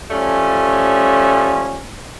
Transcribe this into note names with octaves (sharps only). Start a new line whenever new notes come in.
F3 G3 A3 C#4